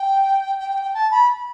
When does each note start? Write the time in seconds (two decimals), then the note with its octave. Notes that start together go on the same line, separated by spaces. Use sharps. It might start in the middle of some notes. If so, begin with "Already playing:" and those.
Already playing: G5
0.59 G5
0.71 G5
0.82 G5
0.94 A5
1.11 B5